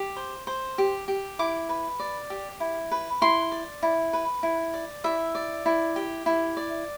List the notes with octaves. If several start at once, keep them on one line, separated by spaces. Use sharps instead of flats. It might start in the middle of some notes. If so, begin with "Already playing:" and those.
Already playing: G4
C5
C5
G4
G4
E4 D6
B4
D5
G4
E4
B4
E4 C6
D5
E4
B4
E4
D5
E4 E5
D5
E4
G4
E4
D5